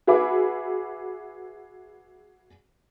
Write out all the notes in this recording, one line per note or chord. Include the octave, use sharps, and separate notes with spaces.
F#4 G#4 B4 E5 B5 D6